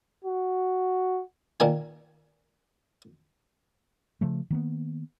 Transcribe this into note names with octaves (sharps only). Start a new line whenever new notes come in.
F#4
A#2 D#3 G#5
C#3 F3 A3
D#3 A#3 B3